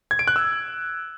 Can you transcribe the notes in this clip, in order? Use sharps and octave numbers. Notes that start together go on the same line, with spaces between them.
G#6
D7
F#6
E6